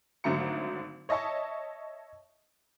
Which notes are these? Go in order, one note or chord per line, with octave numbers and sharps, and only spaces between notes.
G#1 D3 F#3 A3 A#5 C#7
C#5 D#5 E5 A5 C#6